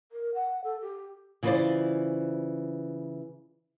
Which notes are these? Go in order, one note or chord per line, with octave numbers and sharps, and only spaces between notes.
A#4
F#5
A4
G4
C#3 E3 F4 A#4 C5 D5